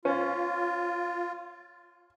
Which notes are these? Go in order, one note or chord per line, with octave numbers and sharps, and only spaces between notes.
C#4 F4 C5